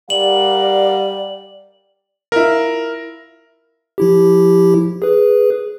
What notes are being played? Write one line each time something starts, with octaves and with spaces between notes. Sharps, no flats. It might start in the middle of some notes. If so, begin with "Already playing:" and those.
G3 A#4 D5 F5 F#5 F#7
E4 F4 A#4
F3 E4 G4
G#4 B4